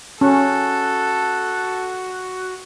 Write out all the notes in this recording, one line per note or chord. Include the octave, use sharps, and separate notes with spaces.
C#4 F#4 A4